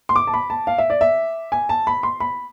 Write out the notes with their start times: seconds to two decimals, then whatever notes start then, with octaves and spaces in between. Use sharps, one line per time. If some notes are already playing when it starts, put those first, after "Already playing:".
0.09 C6
0.16 D6
0.27 A5
0.34 B5
0.50 A5
0.67 F5
0.78 E5
0.90 D5
1.01 E5
1.52 G#5
1.69 A5
1.87 B5
2.03 C6
2.20 B5